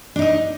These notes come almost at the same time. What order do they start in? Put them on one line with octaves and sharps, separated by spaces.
D4 D#4 D#5